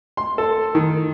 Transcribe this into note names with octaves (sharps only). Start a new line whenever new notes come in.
C6
A4
D#3